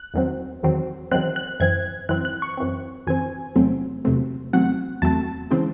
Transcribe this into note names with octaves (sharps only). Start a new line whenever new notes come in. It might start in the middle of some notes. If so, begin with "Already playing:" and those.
Already playing: F#6
E2 D#3 F#3 C4
E2 D#3 F#3 C4
E2 D#3 F#3 C4 F#6
F#6
F#2 E3 C4 G#6
F#2 E3 C4 F#6
F#6
C#6
F#2 E3 C4
F#2 E3 C4 G#5
E2 C3 F#3 A3 C4
E2 C3 F#3 A3 C4
E2 C3 F#3 A3 C4 F#5
E2 C3 F#3 A3 C4 A5
C#3 E3 G#3 C4